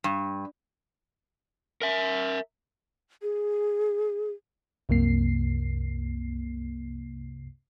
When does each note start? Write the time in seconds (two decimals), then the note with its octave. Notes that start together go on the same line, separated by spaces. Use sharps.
0.04 G2
1.82 A#4 E5
3.22 G#4
4.89 C2 F#2 C3 A#3 C7